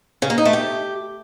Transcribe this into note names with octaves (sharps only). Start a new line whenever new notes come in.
C#3
A#3
D#4
A3
G4